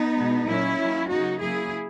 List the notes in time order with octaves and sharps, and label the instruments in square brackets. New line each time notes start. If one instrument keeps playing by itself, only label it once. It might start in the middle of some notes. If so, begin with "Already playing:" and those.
Already playing: [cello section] B3 D#4
B2 G#3
A#2 F#3 A#3 C#4 E4
D#3 F#3 A#3
C#3 F#3 A#3 D#4 F#4
C#3 F#3 A#3 E4 G#4